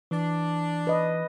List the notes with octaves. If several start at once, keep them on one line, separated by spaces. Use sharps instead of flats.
E3 D4
B4 D#5